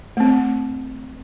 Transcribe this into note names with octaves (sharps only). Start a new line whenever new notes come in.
A3 C4